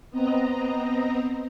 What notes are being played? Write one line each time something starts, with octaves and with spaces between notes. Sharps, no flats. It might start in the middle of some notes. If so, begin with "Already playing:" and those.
B3 C4 D#5 A#5